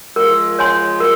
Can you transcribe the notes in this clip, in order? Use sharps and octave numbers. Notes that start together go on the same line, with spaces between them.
F3 G#3 A#4
C#5 G#5 C6
A#4